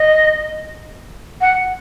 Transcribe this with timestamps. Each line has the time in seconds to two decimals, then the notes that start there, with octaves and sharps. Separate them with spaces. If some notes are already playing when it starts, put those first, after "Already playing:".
Already playing: D#5
1.41 F#5